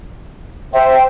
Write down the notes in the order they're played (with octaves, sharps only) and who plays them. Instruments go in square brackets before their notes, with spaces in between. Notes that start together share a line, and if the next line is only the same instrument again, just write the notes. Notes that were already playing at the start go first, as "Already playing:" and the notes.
[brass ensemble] C5 [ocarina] E5 [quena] G5